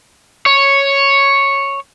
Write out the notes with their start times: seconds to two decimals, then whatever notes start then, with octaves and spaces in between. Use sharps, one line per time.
0.46 C#5